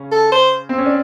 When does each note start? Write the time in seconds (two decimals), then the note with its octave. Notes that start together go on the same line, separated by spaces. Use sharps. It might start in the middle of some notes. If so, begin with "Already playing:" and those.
Already playing: C#3 C#4
0.12 A4
0.32 C5
0.69 C4
0.78 C#4
0.86 D4